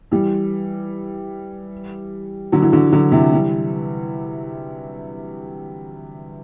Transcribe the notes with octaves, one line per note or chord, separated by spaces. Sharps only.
E3 G3
D3 F#3
E3
D3 F#3
D3 F#3
C3 E3
E3 G3